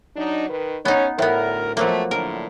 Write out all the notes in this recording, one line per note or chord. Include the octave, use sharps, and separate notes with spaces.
F#3 D4 D#4
D#3 B4
B3 C#4 D#4
D2 A2 B3 A#4
B2 F3 F#3 A3 A#3
A2 D3 A#4